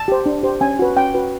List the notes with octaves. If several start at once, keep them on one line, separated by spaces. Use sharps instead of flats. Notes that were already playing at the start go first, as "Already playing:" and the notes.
Already playing: A5
G4 C5
D4
G4 C5
C#4 G#5
F#4 B4
C#4 G5
F#4 B4